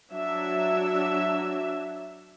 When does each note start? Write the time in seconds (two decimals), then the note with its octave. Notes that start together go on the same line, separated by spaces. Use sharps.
0.10 F#3 D4 E5